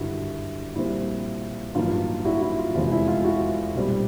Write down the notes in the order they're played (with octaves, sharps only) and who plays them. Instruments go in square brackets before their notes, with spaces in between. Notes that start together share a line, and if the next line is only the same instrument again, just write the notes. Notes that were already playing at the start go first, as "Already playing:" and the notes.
Already playing: [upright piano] G#1 G2 D3 G3 E4 F#4
A#1 A#2 G3 C4 E4
A1 G2 D#3 F#3 A#3 F4
E4 F#4
E4
F4
F1 E2 C3 F3 G#3 F4
E4
F4
E4 F#4
B1 A#2 G3 C4